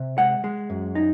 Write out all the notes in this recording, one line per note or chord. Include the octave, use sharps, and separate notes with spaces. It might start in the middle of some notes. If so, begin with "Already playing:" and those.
Already playing: C3
G#3 F#5
G#3
F#2
D#4